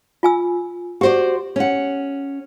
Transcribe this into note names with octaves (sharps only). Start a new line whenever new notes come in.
F4 G#5 E6
F#4 G4 C5 D5
C#4 F#5